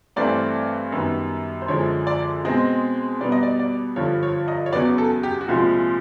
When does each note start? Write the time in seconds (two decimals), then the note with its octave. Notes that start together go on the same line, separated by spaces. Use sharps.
0.16 G2 E3 A3 C4 D5
0.92 F#2 D#3 G3 B3
1.62 C5
1.68 F#2 D3 F3 G#3 C#5
2.07 D5
2.45 B2 G#3 C4 D#5
3.21 B2 G3 B3 D5
3.32 D#5
3.43 D5
3.59 D5
3.96 G2 D3 F3 C#5
4.23 C#5
4.48 D#5
4.66 C#5
4.73 E2 C#3 F#3 B3 D5
4.98 A4
5.23 G4
5.41 F#4
5.48 C2 A#2 F3 G#3 F4